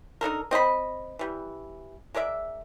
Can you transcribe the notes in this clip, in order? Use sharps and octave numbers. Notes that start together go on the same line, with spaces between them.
D4 D#4 A4 A#4
C4 D#5 G5 B5
E3 G3
G#3 A#4 D5 E5